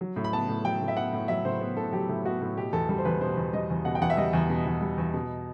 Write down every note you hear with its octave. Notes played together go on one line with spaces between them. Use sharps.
F#3
A2
B5
B3 A5
A2
F#3 G5
A2
E5
B3 F#5
A2
F#3 E5
A2 C5
B3
A2 A4
F#3 G4
A2
B3 F#4
A2
B2 G4
E2 A4
G3 A4
C5
E2 B4
B2 C5
E2
G3 D#5
E2
B2 F#5
G5
E2 F#5
E5
G3 D#5
E2
B2
E2
G3
E2
B2